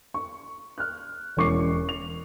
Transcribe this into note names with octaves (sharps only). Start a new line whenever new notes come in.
C#6
F6 F#6
E1 C#4 C#6 D6 C7
F7